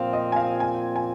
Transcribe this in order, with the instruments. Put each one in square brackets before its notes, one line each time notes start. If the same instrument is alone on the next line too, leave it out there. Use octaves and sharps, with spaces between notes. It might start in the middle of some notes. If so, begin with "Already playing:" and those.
Already playing: [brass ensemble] A#2 F3 C4 F4 [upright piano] F5
[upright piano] D#5
G#5
F5
G#5
G#5